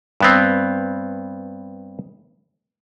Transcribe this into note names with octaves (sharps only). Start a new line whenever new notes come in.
G2 B3 C4